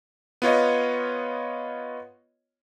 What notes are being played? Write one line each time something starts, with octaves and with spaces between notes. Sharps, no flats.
B3 F4 C#5 D#5